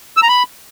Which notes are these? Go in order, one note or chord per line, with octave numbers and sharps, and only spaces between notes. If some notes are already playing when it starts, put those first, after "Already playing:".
E6
A#5
B5